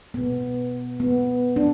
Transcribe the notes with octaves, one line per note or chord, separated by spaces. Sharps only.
B2 B3
B3
D4